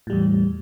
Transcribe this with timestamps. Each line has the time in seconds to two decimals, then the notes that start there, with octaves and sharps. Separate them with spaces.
0.07 A2
0.10 G3
0.13 E2